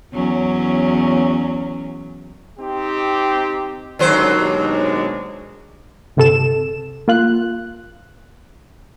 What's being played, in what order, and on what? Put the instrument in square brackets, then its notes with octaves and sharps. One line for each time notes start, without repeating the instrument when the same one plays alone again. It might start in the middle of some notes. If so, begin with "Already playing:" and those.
[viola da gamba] E2 F#3 C#4
[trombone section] C4 D#4 G4
[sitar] D#2 F#3 C5 [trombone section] G#2 D3 C#4
[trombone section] B2 G#3 D4
[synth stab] G1 C3 A4 E7
A#3 F4 F#6